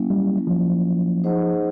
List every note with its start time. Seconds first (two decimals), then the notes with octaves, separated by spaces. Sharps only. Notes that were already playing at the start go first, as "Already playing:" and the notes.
Already playing: F#3 A#3 C#4 E4
0.10 G3
0.47 F3
1.24 D#4 G#4 C5 D#5 F#5